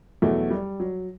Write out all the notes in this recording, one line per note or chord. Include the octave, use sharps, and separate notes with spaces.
E2 B2 F#3 A3
G3
F#3